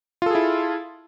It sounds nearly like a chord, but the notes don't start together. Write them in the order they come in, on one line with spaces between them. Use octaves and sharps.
F4 A4 G#4 E4